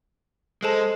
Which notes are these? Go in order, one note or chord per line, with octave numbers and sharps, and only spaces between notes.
G#3 A4 C5 A5